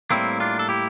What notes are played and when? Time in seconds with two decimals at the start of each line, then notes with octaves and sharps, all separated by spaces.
0.11 A2 G3 A#3 C4 E4
0.40 D4 F4
0.59 A4
0.69 E4 G4